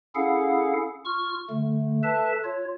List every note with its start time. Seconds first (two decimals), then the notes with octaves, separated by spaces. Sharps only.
0.15 C#4 E4 G#4 A4 F5 F#5
1.05 F4 C#6 F6
1.50 D3 A3
2.03 A4 B4 E5 A5
2.44 F4 C#5